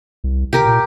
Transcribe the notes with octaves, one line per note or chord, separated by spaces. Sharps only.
C2
C3 G4 A#4 D6
A#2